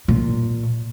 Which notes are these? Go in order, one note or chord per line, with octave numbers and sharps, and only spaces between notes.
A#2